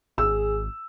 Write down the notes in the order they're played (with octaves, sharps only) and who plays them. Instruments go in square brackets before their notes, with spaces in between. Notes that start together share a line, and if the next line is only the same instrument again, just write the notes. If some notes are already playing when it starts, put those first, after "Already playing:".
[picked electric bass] G#1 [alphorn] G#4 [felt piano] E6